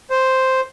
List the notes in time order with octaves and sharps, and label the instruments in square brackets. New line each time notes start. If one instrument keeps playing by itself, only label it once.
[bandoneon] C5